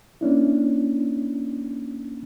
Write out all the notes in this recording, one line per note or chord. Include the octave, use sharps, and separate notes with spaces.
A#3 C#4 D4 E4